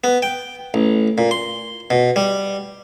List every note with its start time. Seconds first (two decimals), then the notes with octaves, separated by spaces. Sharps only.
0.04 B3
0.22 G5
0.74 A1
1.18 A#2
1.31 C6
1.90 B2
2.16 G3